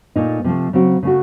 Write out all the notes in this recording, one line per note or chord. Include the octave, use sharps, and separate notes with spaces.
A#2 A3 D#4
C3 F3 A3
C#3 F#3 C4 F#4
C#3 A3 C#4 F#4